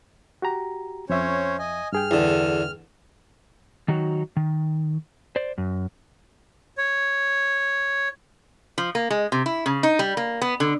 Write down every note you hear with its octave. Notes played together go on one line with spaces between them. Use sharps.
F#4 G4 A#5
F2 C#4 C5 C#5 E5
D#5 G#5
G2 G#4 G5 F6
E2 D3
D#3 F#3 D#4 F#4
D#3
C5 D5
F#2
C#5
F3
A#3
G#3
C3
E4
C#3
D#4
G3
A#3
B3
D3